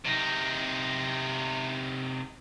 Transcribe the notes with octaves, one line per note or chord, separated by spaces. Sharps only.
C3 D#4